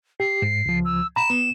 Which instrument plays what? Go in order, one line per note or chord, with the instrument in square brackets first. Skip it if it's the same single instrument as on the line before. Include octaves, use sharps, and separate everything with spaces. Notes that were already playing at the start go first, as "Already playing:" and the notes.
[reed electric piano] G4 [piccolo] C7
[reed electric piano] G#2
C#2 F3
[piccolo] E6
[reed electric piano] A#5 B5 [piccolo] E7
[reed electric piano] B3